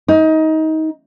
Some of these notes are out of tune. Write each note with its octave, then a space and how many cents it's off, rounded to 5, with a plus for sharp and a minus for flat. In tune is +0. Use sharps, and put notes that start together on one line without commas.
D#4 +25